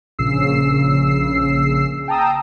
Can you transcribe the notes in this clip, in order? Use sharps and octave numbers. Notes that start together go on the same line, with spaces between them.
A#1 C#3 E6 C7
G5 A5 A#5 D#6 E6